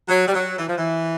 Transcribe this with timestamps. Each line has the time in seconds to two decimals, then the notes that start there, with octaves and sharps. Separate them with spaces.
0.09 F#3
0.28 G3
0.34 F#3
0.59 E3
0.68 F3
0.78 E3